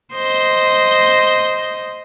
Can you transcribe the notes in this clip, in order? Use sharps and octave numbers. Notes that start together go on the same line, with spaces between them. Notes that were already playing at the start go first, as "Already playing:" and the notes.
C5 D#5